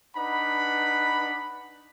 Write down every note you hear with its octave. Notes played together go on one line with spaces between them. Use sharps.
D4 D#4 B4 F#5 B5